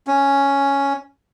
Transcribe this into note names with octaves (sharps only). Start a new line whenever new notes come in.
C#4